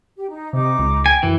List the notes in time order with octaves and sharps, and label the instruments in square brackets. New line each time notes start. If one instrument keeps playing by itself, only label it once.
[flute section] G4
D#4
[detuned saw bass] C3 [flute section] D#4 D6
[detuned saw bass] C#2
[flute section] G5 [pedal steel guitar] G#5
[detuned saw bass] F#2 [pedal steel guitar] E3